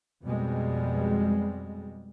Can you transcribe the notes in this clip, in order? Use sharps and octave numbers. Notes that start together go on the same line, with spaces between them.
F2 B2 G3 G#3